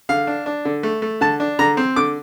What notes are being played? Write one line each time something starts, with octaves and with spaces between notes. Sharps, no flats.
D3 F5
D4
D4
D3
A3
A3
D3 A5
D4
D3 A#5
C4
D3 D6